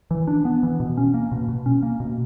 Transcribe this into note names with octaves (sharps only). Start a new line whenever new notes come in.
E3
D4
B3
E3
B2
C#4
A#3
B2
B2
C#4
A#3
B2